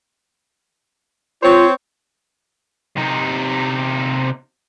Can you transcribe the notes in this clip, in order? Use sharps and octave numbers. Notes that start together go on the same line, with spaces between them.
C4 F4 C5 C#5
C3 D#4